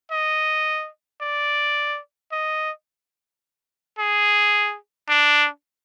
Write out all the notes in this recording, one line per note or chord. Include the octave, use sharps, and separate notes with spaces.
D#5
D5
D#5
G#4
D4